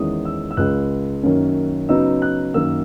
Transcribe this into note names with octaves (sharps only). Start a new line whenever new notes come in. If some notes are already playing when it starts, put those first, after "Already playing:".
Already playing: E2 D#3 G#3 C#4 D#6
E6
E6
C#2 C#3 G#3 F#6
F#2 D#3 A#3 C#4
C#3 F#3 B3 D#4 E6
F#6
F#2 D#3 A#3 E6